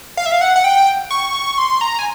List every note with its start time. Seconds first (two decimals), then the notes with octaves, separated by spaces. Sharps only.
0.17 F5
0.26 E5
0.32 F5
0.41 F#5
0.56 F#5
0.64 G5
1.11 C#6
1.58 C6
1.81 A#5
1.99 G#5